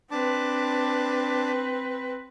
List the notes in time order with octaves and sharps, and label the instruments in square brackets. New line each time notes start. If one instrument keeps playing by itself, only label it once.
[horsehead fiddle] C4 B4 [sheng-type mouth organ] D4 A5 D6